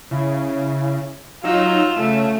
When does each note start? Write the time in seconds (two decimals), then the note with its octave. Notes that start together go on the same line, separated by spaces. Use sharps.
0.11 C#3 E4
1.44 F#3 D#4 F4 E6
1.99 C#3 A3